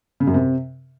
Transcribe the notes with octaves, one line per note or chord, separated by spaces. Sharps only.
C#3
F#2
C3